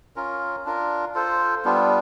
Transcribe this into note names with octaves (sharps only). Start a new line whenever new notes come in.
C#4 F4 A#4
D4 F4 A#4
F4 A4 C5
G3 B3 D4 F4